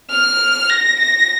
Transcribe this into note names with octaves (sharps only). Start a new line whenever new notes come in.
F6
A#6
A#6